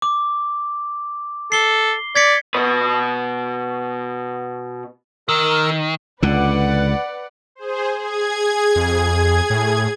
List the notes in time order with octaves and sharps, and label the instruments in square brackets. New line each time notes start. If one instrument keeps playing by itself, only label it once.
[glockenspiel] D6
[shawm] A4 [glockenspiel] C7 G7
[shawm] D5 [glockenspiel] G#6 B6 C#7
[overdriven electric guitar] B2 B4
[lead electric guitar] D#3 [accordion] A#4 E6 F6
[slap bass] C#2 D3 [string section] B4 D5 F#5
[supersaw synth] G#4 C5
G#4 G#6
[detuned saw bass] F2
A2